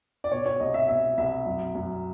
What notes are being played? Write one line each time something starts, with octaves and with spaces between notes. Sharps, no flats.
D5
B2 C#5
C#5
C2 D#5
E5
B2 E5
C2 E5
F#2
F#2